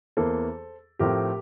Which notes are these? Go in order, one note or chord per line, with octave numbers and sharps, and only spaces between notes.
E2 E3 A#3 A4 C5
A2 F3 A3 C4 G4 A#4